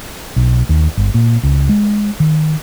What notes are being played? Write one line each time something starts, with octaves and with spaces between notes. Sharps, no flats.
B1
D#2
G1
A#2
C#2
G#3
D#3